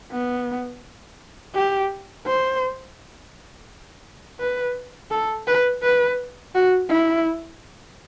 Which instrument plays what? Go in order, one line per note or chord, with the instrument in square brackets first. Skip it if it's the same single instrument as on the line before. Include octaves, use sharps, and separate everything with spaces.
[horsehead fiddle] B3
G4
C5
B4
A4
B4
B4
F#4
E4